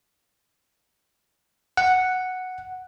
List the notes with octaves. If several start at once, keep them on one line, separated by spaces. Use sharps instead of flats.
F#5